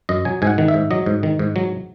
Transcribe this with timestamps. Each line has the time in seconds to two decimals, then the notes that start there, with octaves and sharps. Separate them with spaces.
0.09 F#2 D#5
0.25 F#3 G#5
0.42 G#2 G#5
0.47 F#5
0.58 D#3
0.68 E5
0.74 G#2
0.91 F#3 D#5
1.06 G#2
1.23 D#3
1.39 G#2
1.56 F#3